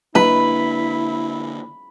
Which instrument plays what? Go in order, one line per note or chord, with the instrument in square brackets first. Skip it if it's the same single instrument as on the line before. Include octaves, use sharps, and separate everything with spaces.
[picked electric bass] D3 A#3 D4 [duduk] E4 [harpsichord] B4 [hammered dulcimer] B5